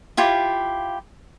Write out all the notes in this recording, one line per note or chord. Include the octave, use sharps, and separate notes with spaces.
E4 F4 G4